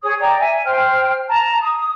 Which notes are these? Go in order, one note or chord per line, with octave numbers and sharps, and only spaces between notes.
G#4 C#5 D#6
D5 G5 A#5
E5 G#5
C5 G5 F6
A5 A#5
D#6